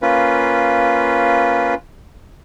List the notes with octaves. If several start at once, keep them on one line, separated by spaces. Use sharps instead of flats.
A#3 C#4 F4 B4